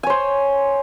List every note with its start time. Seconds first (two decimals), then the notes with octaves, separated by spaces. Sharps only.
0.03 G#5
0.07 C#5
0.10 C5